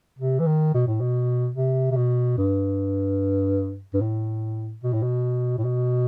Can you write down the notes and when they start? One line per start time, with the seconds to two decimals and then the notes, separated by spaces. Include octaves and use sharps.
0.19 C3
0.40 E3
0.47 D#3
0.74 B2
0.88 A2
1.01 B2
1.55 C3
1.91 C3
1.96 B2
2.38 G2
3.94 G2
4.01 A2
4.83 B2
4.93 A2
5.03 B2
5.58 A2
5.64 B2